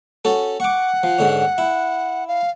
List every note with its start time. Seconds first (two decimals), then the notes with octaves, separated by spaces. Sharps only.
0.25 C#4 F#4 A4
0.60 F#5 C#6 D6
1.03 F3
1.18 G#2 D3 C#4
1.58 E4
2.28 F5